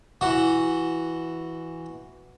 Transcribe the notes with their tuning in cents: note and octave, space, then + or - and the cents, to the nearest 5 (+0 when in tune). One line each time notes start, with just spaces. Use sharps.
E3 +0 F#4 +0